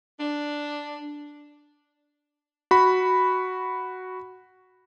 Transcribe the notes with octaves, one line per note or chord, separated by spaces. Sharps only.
D4
F#4 B5